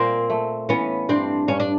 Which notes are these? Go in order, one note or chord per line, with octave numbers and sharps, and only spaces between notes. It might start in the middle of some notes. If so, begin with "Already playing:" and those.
Already playing: A#2 A#3 C4
A3
E3 B3 C#4
G2 C4 D4
G2 C#4
D4